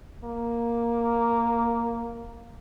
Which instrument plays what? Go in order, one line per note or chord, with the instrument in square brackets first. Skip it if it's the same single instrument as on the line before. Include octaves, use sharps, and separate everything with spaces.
[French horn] A#3